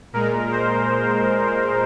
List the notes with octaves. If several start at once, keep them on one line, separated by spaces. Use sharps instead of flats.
A#2 G#3 A#4
C5